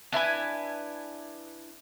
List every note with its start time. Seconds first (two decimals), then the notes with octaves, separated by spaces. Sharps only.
0.12 D4 E4 B4 G#5